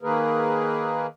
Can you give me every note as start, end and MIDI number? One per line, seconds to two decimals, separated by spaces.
0.03 1.07 51
0.03 1.07 58
0.03 1.07 68
0.03 1.07 70
0.03 1.07 71